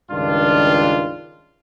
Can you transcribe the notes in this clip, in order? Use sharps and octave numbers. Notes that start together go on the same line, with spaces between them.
C#2 G2 D#3 D4 F4